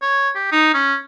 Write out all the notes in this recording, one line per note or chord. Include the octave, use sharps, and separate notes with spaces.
C#5
G4
D#4
C#4